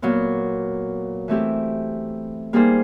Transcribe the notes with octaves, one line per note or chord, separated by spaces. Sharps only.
A#2 F#3 B3
E3 A3 C4 E4 G4
G3 A#3 D#4 G#4 C5